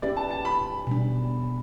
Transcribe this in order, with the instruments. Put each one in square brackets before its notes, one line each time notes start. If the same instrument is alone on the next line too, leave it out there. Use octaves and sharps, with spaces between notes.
[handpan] C#4 G4 B4 E5 [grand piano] D5
[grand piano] A5
A5
B5
[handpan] B2 G3 D4